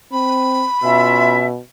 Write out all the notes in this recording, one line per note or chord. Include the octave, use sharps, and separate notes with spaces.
C4 B5
B2 C#4 F4 E5